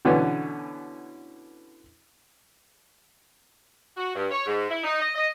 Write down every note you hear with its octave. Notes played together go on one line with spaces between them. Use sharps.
B2 D3 E3 B3 C#4
F#4
G2
C#5
G#2
E4
D#4
D#5
D#5